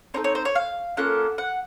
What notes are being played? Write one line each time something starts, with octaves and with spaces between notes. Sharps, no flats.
C4 D#4 A4 C#5
C#5
C5
C#5
F5
A#3 C#4 F4 A4 F#5
F#5